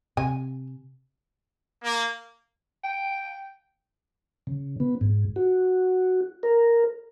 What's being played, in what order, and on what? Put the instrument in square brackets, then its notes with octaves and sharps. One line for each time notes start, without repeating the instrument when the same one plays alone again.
[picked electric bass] C3 [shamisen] G#5
[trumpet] A#3
[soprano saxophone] G5
[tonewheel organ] C#3
B3
G#2
F#4
A#4